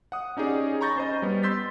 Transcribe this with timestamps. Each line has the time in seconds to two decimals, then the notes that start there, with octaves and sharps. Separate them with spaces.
0.12 F#5 D#6
0.37 C#4 D#4 G4 G#4 D5
0.81 A#5 B5 C#6 G6 A6 A#6
0.96 C#4 C5 D#5
1.22 G3 B3
1.43 C6 E6 G6 A6 B6